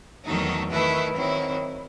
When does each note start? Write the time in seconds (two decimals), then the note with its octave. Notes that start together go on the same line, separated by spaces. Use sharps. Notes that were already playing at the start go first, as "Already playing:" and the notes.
0.25 E2 D#3 F#3 A3 D#4
0.70 D#3 A3 E4 B4
1.15 D#3 F#3 C4 E4